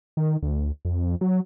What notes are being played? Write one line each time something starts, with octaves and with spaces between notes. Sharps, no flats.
D#3
D2
F2
F#3